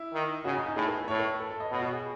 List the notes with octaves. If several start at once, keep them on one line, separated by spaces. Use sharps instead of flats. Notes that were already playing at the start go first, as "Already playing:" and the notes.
Already playing: E4
D#3
C#3 F#4
D#4
D#4
A2 G#4
B4
B4
A2 C#5
B4
A4
A4
D#5
B2 C#5
F#4
G#4